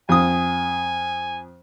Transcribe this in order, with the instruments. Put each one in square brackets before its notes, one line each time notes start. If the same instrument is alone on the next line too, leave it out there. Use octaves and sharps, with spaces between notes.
[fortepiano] F2 D#6 [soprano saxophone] G#5